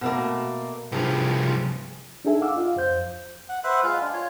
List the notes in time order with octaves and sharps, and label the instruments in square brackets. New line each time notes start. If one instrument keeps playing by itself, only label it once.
[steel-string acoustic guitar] B2 A3 A#3
[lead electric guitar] C2 F3 [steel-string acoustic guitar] G2 G#4
[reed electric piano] D4 D#4 G#4 A4 E5 G#5
F5 F#5 D6 E6
F4 D#5 F5
F2 C5 G6
[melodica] F#5
B4 C5 E5 F#5
G#3 F4 F5
D4
F4 C#5